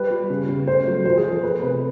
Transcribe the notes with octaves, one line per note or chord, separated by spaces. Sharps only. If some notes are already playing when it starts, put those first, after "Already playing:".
Already playing: G3 B4
G3
C#3
C#3
A3 C5
F#3
F3 C5
G#4
F3
A4
A3 B4
C3 B4